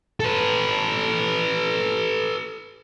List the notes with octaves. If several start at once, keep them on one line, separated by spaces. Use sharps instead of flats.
A4 B4